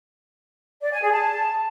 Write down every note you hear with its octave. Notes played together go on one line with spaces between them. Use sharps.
D5
G#5
G#4
A5